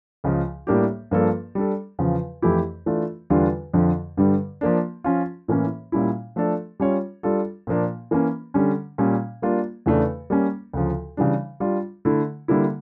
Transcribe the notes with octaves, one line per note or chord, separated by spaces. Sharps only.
C#2 C#3 F3
A2 G3 A#3 D4 G4
G2 F3 A#3 D4 A4
G3 D4 A4
E2 C#3 F3
F2 E3 A3 E4 G4
E3 A3 D4 F4
E2 D3 G3 D4 F4
F2 D3 F3
G2 D3 G3
F3 A#3 D4
F3 C#4 F4
A2 E3 A#3 C#4
A#2 G3 C#4 E4
F3 A3 D4 A4
G3 C#4 F4 C#5
G3 D4 F4 A4
A#2 F3 A#3 D4
E3 A#3 C#4
D3 G3 C#4
A#2 G3 C#4
G3 A#3 D4 F4
E2 C#3 E3 A3 D4
G3 A#3 C#4
D2 C#3 F3
C#3 E3 G3 D4
G3 D4 F4
D3 A3 E4
D3 G3 A#3 E4